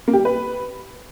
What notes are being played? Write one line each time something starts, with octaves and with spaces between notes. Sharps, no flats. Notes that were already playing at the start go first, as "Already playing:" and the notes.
A#3
G4
G3
B4